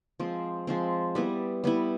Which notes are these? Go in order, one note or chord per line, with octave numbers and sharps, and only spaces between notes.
F3 G#3 C4
F3 G#3 C4
G3 B3 E4
G3 B3 E4